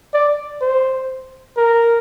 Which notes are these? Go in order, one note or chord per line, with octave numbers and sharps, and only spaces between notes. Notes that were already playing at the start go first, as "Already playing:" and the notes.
D5
C5
A#4